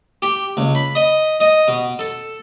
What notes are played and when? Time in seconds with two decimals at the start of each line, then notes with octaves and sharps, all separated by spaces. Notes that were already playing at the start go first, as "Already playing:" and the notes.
0.22 G4
0.57 C#2
0.75 B5
0.95 D#5
1.40 D#5
1.68 B2
1.99 A4